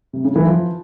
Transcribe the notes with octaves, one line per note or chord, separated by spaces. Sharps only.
C3
C#3
E3
F3